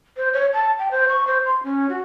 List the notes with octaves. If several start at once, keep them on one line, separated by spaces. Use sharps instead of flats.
C5
C#5
A5
G5
C5
C#6
C5
C6
C#4
F#4